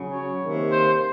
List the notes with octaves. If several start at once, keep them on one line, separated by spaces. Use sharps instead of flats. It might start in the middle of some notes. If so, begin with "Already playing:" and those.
Already playing: C#3 F#3 C#4
C#5
C3 D#3 A#3
C5